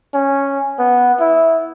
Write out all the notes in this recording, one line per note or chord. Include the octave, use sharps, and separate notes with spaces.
C#4
B3
E4